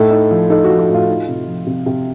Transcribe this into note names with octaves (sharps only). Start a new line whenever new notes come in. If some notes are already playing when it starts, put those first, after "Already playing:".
Already playing: A2 D#4 A4
D#4
F3
D#4 A4
F#4
F3
F#4
A2
F4
D#4
C3
F3
C3
C3